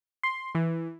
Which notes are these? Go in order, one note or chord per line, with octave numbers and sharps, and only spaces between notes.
C6
E3